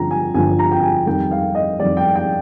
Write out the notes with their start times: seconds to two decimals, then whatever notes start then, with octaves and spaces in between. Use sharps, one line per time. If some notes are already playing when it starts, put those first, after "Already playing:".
Already playing: G1 G2 F3 A#5
0.11 G#5
0.34 G1 G2 F3 G#5
0.59 A#5
0.71 G5
0.82 G#5
1.06 F2 D#3 G3 G5
1.31 F5
1.55 D#5
1.79 F2 D#3 G3 D5
1.97 G5
2.16 G5